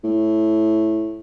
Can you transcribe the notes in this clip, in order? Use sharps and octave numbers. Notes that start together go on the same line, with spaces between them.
A2